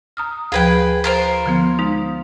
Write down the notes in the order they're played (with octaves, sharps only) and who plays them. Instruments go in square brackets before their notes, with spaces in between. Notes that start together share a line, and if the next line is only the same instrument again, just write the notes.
[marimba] A#5 D#6 F6
[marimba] D2 F3 [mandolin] G#4 B4 G5
[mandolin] F4 A#4 C5
[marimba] D3 F3 B3
G#3 D#4